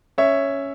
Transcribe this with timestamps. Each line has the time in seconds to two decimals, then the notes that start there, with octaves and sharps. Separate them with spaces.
0.18 C#4 C#5 E5